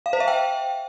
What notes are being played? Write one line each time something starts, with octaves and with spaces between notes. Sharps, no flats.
F5
C5
E5
G5